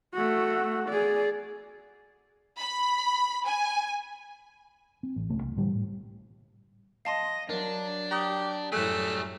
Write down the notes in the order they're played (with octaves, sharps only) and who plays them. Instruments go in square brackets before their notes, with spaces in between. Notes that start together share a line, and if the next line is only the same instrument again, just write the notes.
[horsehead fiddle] A3 F#4
G#4 D5
[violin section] B5
G#5
[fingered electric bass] C4
A1
E1 C#2 C#3 A3
C2
A2 D3 E3 G3
A2
[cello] D#5 [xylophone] F5 A5 C6
[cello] F#3 [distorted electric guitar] D4 [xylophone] A#4
[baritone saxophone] G4 [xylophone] A#5 D#6
[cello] F#2 A2 [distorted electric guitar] G3 G#4 [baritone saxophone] A3 [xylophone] G#5 F#6